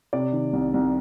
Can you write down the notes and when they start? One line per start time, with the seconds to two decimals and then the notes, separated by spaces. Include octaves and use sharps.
0.13 C3 D5
0.33 D#3
0.53 C2
0.74 C2